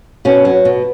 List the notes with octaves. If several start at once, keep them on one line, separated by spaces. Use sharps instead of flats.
B2 C#4
F#3
B2